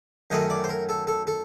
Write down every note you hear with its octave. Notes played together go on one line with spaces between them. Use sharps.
F#2 D#3 F#3 A3 D#5
D5
C5
A#4
A4
A4
A4